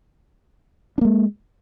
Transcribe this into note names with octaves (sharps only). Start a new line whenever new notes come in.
G#3 A#3 D4